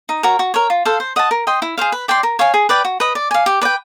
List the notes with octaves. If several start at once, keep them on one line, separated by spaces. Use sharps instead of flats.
D#4
F#4 A#4 C#5
F#4
A#4 C#5
F4
A4 C5 F5
C5
D#5 F#5 A5
A#4
D#5 G5 C6
E4
G#4 C5 F5
B4
D5 G5 C6
A#4
C#5 F5 G#5
G#4
B4 D5 G5
F#4
B4 D#5
D5
F5 G#5
G4
B4 D5 G5